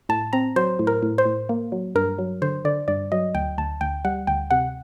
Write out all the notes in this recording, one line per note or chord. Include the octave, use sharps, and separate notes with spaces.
A2 A5
C4 A#5
F#3 C5
A2
A#4
A2
C5
A2
A#3
F#3
G2 A#4
F#3
D3 C5
D3 D5
G2 D5
F#3 D#5
D2 G5
D2 A5
D2 G5
G3 F#5
D2 G5
C3 F#5